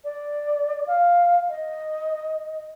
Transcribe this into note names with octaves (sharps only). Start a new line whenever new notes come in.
D5
F5
D#5